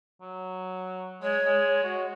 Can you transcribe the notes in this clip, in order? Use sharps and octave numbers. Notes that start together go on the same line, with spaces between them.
F#3
G#3 C#5
G#3
F#4